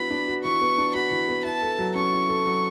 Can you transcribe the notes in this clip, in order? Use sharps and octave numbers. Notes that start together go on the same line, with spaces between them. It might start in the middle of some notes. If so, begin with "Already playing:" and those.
Already playing: E3 B3 D4 F#4 B5
D4
F#4
E3 C#6
B3
D4
F#4 B5
E3
B3
E4 A5
A4
F#3
C#4 C#6
E4
A4
F#3